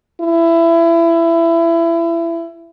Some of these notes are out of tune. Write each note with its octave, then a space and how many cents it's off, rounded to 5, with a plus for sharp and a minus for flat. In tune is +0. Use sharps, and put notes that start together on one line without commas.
E4 +25